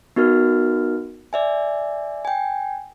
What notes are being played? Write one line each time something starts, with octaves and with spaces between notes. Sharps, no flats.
B3 D#4 F#4 A#4 F6
D5 E5 G#5
G5 G#5